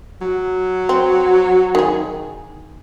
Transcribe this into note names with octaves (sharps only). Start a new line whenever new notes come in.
F#3
C4
D#3 G#4